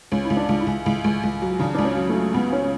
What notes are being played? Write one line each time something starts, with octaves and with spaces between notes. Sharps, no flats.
C#2 C#4
E4
C#2
D4
C#2
E4
C#2
C#2 E4
C#2
C#2
F#3
C#3 D4
C#2 D4
C#4
F#3
A3
F#3
C#2 B3
C#4